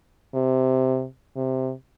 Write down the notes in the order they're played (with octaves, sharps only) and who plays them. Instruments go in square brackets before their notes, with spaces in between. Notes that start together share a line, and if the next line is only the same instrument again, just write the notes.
[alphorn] C3
C3